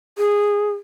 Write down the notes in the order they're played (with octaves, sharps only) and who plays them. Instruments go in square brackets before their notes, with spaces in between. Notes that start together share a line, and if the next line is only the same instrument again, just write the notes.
[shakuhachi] G#4